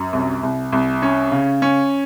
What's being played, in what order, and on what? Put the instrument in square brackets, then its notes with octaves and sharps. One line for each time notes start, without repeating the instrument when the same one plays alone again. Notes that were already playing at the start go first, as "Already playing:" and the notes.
Already playing: [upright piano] F#2
C2
C2
C2
C#4
C#3
C#4